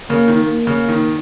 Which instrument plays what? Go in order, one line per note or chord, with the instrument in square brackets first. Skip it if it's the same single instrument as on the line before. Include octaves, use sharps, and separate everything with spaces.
[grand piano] C#3 [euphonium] A#3
[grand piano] D#3
[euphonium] A#3
[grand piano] C#3
D#3